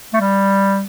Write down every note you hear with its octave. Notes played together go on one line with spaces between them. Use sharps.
A3
G3